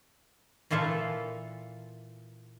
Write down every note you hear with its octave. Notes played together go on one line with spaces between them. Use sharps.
A#2 E3 F4 A4 E5